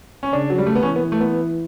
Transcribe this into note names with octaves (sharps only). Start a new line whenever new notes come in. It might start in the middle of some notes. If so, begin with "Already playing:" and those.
C#4
C#3 D4
F#3
G3
A3
B3
E3 C#4
B3
A3
B3